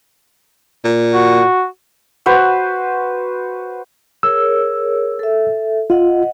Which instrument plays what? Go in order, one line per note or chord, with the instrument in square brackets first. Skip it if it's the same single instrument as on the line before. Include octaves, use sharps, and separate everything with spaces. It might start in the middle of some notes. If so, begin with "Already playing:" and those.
[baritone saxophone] A#2
[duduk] F#4
[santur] F#4 B4 C5
[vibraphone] G#4 A#4 C#5 [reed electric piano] E6
[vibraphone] A4 E5
[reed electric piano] F4 [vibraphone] D#5 F#5